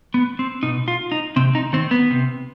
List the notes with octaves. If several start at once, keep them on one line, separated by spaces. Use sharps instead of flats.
B3
C4
B2 D#4
F4
D#4
C3 C4
D#4
D#3 C4
B3
C3